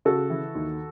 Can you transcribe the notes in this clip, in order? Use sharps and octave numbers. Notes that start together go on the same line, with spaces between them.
C#3 F#4 A4
E3
D#2